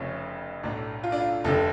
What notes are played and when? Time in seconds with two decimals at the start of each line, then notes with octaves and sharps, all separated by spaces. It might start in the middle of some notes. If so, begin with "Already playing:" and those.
Already playing: F1 F2 C#3 C#4
0.63 B1 A2 D4
1.04 F4
1.12 D4
1.20 F4
1.44 F1 F2 D3 A4